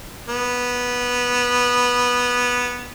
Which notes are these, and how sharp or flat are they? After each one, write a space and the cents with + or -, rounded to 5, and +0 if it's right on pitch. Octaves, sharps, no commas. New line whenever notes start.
B3 -10